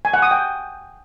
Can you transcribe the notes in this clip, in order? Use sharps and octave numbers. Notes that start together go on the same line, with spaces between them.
G#5
F#5
D#6
G5